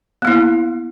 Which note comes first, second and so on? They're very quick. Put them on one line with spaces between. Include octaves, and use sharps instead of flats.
B3 A#3 E4